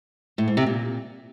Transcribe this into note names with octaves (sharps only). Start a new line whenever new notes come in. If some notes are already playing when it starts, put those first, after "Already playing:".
A2
G#2
C3
A#2